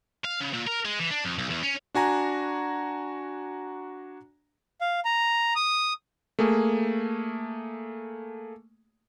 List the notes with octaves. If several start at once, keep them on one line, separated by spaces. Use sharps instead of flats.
F5
C#3
A#2
A#4
G#3
E3
D4
F2
B1
E2
C#4
D4 F#4 G#5 A#5
F5
A#5
D#6
A3 A#3 G#4